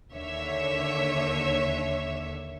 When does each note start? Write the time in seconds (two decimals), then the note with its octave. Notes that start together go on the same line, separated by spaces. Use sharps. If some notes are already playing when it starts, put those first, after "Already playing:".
0.12 D#2 D3 C#5 E5